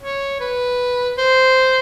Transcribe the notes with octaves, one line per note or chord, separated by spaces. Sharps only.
C#5
B4
C5